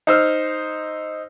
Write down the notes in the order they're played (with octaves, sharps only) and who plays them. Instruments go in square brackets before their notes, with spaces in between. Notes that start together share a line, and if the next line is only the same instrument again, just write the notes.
[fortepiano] D#4 C5 E6 F6